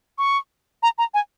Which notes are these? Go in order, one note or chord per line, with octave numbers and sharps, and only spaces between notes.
C#6
A#5
A#5
G#5